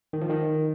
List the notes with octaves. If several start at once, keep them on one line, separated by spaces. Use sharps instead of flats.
D#3
F3
D#3